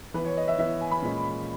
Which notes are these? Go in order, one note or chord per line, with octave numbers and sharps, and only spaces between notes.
E3 B3 E4 B4
C#5
D#5
E5
E3 B3 E4 E5
G#5
B5
A#2 G#3 C#4